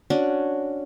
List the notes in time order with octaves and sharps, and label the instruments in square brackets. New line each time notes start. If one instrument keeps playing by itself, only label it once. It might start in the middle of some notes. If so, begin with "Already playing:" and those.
[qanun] C#4 D4 F#4